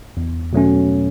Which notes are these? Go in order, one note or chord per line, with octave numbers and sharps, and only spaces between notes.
E2
B2 F#3 A3 C#4